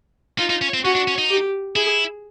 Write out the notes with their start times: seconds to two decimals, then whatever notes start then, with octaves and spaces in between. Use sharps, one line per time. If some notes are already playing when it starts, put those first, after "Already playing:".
0.38 D#4 F4
0.50 D#4
0.61 C#4
0.74 C4
0.84 C#4 F#4
0.96 D4
1.08 C#4
1.18 D#4
1.30 G4
1.75 E4 G#4